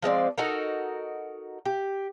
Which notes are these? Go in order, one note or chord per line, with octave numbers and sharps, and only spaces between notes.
F3 G#3 C4 D5
D#4 F#4 A4 A#4
G4